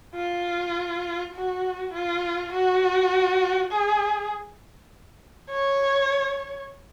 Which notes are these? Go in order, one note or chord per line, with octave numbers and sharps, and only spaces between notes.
F4
F#4
F4
F#4
G#4
C#5